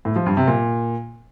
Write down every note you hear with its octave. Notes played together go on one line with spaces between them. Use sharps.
A2
F3
G2
C3
A#2